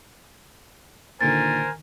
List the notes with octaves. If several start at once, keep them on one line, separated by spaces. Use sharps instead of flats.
A#2 D3 D#3 A#4 C5 G#5 A6